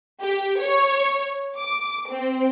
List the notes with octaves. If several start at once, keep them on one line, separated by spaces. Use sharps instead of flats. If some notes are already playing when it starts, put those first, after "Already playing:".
G4
C#5
D6
C4